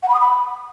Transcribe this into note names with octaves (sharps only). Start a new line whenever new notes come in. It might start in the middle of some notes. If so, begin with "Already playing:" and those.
F#5
B5
D#6
B5